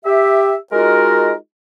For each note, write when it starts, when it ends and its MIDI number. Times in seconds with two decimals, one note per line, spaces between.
0.05 0.56 67
0.05 0.56 76
0.73 1.33 56
0.73 1.33 63
0.73 1.33 65
0.73 1.33 66
0.73 1.33 70